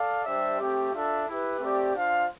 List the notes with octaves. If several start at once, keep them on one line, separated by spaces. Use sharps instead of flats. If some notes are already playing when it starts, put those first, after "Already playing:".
Already playing: A4 D5 F5
G3 D4 G4 C5 E5
A3 C4 G4
D4 F4 A4 E5
E4 G4 B4
A3 C4 G4 D5
D4 F4 C5 F5